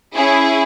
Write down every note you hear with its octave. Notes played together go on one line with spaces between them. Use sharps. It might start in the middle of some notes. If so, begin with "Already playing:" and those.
C#4 E4 G#4